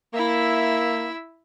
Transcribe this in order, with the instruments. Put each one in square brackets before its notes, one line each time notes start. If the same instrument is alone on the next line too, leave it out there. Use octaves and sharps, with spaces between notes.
[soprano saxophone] A#3 [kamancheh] E4 E5